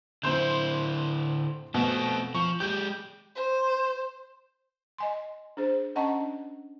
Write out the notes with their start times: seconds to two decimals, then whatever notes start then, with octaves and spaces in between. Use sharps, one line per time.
0.23 D3 C4 E4 C6 G6
1.74 B2 A3 C4
2.35 F3 C#6
2.60 G#3 G4 G6
3.36 C5
4.98 D#5 G#5 C6
5.57 D4 G#4 C5
5.95 C#4 D#5 F#5 A5 A#5 C#6
6.20 D4